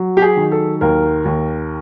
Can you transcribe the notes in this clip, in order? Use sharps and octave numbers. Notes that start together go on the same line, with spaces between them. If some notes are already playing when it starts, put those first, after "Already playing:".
Already playing: F#3
G4
G#4
D#3
A4
D#2 A#4
D#2